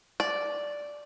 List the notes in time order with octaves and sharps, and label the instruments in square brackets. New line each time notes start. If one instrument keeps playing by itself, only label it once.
[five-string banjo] D5